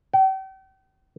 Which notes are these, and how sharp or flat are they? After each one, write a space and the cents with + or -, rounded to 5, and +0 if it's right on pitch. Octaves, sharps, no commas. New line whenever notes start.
G5 -40